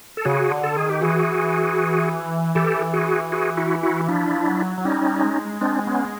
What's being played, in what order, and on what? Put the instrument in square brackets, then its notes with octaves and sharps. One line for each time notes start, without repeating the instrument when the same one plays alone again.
[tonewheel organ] A4
[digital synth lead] C#3 [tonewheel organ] F#4 G#4
[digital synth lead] D3
[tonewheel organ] A4
[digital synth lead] D#3 [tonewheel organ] G#4
[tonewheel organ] G4
[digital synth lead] E3 [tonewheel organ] F#4 G#4
[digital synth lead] E3 [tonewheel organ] G4 A4
[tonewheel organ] F#4 G#4
F#4 G#4
E4 F#4
E4 F#4
[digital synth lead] F3 [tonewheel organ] D4 E4
[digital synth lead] F#3
F#3
[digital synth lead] G3 [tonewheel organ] C#4 D#4
[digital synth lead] G#3
[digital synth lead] G#3 [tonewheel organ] C4 D4
[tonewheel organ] B3 C#4